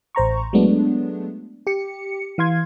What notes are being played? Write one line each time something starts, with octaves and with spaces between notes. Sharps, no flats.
A1 C5 A#5 C#6
F#3 G#3 A3 B3 D4
G4 C#7
E3 F5 C6 G#6